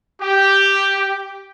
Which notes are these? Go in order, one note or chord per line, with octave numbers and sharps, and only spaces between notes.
G4